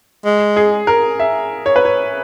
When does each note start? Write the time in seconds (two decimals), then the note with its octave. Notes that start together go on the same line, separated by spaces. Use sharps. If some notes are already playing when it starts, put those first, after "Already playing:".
0.25 G#3
0.56 G#4
0.87 A#4
1.20 E5
1.66 C#5
1.76 B4
1.85 C#5